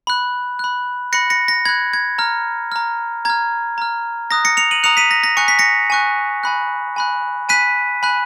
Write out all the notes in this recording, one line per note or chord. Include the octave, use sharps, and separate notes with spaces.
B5 F#6
B5 F#6
B5 F#6 A#6 C#7
A#6 C#7
A#6
B5 F#6 G#6
G#6
A#5 F6
A#5 F6
A#5 F6 G#6
A#5 F6
A#5 D#6 F#6 A#6
A#6 C#7
C#7 F7
D#7 F#7
A#5 D#6 F#6 C#7 F7
B6 D#7
A#6
A#6
G#5 C#6 F#6 C#7
B6
A#6 C#7
G#5 C#6 F#6
G#5 B5 F#6
G#5 B5 F#6
G#5 B5 F#6 B6 D#7
G#5 B5 F#6